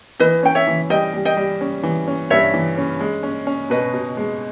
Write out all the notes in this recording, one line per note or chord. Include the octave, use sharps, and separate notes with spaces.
E3 B4 D#5
C#4 G5
C#5 E5
E3
G3 D#5 G5
G3
D#5 G5
G3
C#4
E3
C#4
G2 C#5 E5
E3
C#4
G#3
C#4
C#4
B2 B4 D#5
B2
G#3